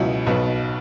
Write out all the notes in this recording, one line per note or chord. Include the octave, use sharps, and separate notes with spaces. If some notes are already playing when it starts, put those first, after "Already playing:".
Already playing: C#2 B2 F#3 C#4 E4
B1 B2 F#3 B3